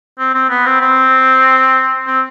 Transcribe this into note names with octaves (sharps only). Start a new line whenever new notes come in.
C4
C4
B3
C4
C4
C4